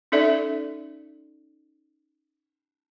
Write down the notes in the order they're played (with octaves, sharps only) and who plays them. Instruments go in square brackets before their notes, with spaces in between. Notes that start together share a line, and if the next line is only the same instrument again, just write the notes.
[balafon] C#4 D#4 A4 D5 E5